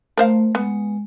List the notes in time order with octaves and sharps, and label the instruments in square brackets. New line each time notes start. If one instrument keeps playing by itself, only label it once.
[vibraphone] A3 [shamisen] A#4 C5 F5
[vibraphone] G#3 [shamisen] B3